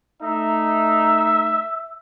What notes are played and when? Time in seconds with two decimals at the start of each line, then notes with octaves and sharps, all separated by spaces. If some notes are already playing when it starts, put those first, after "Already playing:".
0.22 A3 D#4 E5